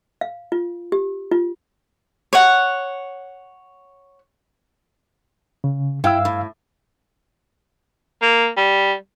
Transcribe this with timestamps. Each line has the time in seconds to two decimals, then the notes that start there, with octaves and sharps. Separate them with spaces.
0.21 F5
0.52 F4
0.92 G4
1.31 F4
2.33 C#5 F#5
5.64 C#3
6.04 G2 E4 F5 G5 E6
6.25 A2
8.22 A#3
8.57 G3